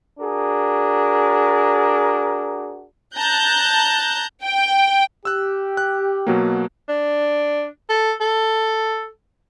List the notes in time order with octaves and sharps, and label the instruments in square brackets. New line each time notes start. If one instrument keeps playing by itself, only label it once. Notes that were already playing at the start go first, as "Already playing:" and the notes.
[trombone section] D4 F#4 G#4 A#4
[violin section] A5 A#5 F#6 G6
[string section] G5
[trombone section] G4 [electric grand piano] E6 F#6
[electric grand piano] F#6
B2 F#3 A#3
[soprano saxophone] D4
A4
A4